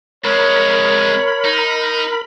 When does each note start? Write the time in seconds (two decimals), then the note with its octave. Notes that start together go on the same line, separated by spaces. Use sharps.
0.25 F2 G#3 A#4 C#5 B5
1.44 D#4